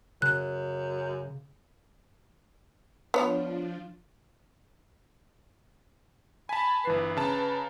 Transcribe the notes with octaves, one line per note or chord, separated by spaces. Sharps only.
F#2 C#3 F#6
F3 B3 D4 F4 C#5
G#5 A5 B5
G1 E3 B4 C7
C#3 A5 A#5